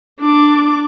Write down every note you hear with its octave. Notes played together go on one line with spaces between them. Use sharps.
D4 D6